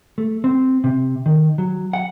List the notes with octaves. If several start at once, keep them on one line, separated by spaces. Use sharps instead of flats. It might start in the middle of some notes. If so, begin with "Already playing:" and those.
A3
C4
C3
D#3
F#3
F#5